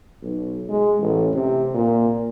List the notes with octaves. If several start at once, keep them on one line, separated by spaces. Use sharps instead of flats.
B1
G#3
A1
C3
A#2